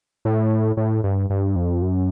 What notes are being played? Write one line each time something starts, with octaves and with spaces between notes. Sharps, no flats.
A2
A2
G2
G2
F2
F#2